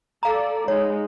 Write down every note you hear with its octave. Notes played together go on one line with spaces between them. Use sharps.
A4 D5 F5 A#5
G#3 D#4 C#5